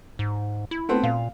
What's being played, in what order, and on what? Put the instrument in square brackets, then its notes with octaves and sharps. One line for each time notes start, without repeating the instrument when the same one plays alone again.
[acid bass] G#2
E4
[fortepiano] A3 B3 C4
[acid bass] A#2 [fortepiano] F5